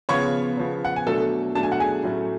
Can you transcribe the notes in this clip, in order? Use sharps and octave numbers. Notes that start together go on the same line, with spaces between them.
C#3 F3 B3 C#5 C#6
C#3 F3 B3
F#5
G#5
B2 F#3 A3 D4 A4 A5
B2 F#3 A3 D4 A5
G#5
F#5
G#4 G#5
A2 F#3 A3 C#4